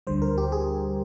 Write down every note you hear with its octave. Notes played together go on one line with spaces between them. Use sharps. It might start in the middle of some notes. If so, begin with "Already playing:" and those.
D2 D3 G3 C5
A#4
G4
G#4